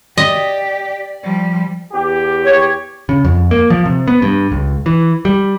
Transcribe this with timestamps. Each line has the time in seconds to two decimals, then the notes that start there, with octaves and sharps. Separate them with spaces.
0.18 G4 D5 D#5
1.23 F3 G3
1.93 E2 G4
2.45 C#5
3.09 C#3
3.25 F2
3.51 A#3
3.70 F3
3.86 C3
4.08 B3
4.22 G2
4.52 C#2
4.86 E3
5.25 G3